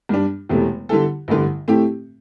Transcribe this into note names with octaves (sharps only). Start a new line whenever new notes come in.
G2 G3 D4
E1 E2 C3 A3
D3 G3 E4 A4
A1 G2 D3 G3
A2 A3 C4 E4 G4